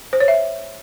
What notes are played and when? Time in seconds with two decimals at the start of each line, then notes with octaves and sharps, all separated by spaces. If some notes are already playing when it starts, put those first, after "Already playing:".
0.13 C5
0.20 C#5
0.28 E5